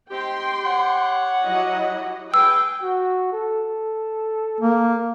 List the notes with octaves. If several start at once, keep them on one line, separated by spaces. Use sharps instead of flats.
C4 D#4 G4 G5 C6
G4 C#5 F#5
F#3 E4 D#5
G#4 B4 G5 E6
F#4
A4
A#3